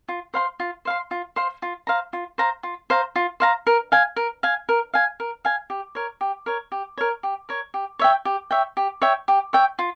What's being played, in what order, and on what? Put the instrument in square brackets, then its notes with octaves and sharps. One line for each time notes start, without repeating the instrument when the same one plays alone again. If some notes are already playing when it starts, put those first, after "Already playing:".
[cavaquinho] F4
C5 F5 C6
F4
C5 F5 C6
F4
C5 F5 C6
F4
C5 F5 A#5
F4
C5 F5 A#5
F4
C5 F5 A#5
F4
C5 F5 A#5
A#4
F5 G#5
A#4
F5 G#5
A#4
F5 G#5
A#4
F5 G#5
G4
A#4 C#5
G4
A#4 C#5
G4
A#4 C#5
G4
A#4 C#5
G4
C#5 E5 G5
G4
C#5 E5 G5
G4
C#5 E5 G5
G4
C#5 E5 G5
F4